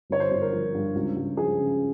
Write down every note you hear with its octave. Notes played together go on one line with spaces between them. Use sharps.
G1 C#5
C5
G1 C5
A#4
F3
G2
C#2
C#2
F3 G#4
C#3